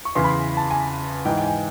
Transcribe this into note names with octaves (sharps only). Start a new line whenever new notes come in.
C#6
E2 C#3 E3 C6
B5
C6
A5
G#5
G#2 E3 G5
G5
G#5